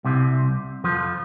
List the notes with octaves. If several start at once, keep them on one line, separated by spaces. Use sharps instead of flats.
C2 C3
F2 F3